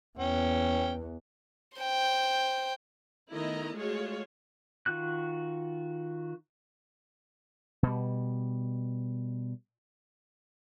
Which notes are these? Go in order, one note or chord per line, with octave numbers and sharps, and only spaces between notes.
E2 C#4 G5
C5 G5
D#3 A3 B3 E4 D#5 A#5
G#3 A3 F4 F#4 G#4 C#5
D#3 F4 F#4 F#6
B2 G3